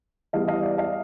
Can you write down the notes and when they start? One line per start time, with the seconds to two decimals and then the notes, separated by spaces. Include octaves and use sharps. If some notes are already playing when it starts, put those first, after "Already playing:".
0.33 E3 G3 B3 D#5 F5
0.48 D#5 F5
0.63 D5 E5
0.77 D#5 F5